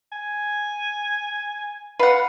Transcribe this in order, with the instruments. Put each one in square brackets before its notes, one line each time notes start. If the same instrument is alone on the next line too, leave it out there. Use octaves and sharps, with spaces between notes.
[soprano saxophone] G#5
[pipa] B4 F#5 [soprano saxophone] F5